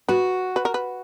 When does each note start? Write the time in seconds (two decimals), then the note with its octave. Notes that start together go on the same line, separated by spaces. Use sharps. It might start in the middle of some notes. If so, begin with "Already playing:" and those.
0.09 F#4 B4
0.56 B4
0.65 A#4
0.74 B4